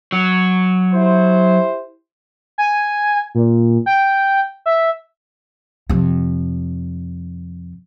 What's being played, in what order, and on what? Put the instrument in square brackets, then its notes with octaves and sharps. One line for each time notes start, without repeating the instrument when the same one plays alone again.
[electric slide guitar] F#3
[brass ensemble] E4 G4 C5
[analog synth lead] G#5
A#2
G5
E5
[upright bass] F2 C3